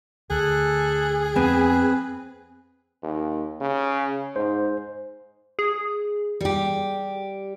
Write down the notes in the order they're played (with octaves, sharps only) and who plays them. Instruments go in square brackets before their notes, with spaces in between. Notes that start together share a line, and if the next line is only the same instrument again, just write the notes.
[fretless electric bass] D2 [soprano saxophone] G#4 [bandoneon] A4 F#6
[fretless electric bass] F2 [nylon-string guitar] B3 C4 G#5 [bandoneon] B4
[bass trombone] D#2
C#3
[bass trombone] G#2 [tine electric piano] C5
[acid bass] G#4
[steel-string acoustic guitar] G3 G4